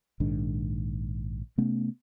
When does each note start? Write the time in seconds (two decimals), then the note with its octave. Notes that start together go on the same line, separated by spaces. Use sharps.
0.20 A#1 G#2 D#3 D4
1.58 C3 A3 B3 C#4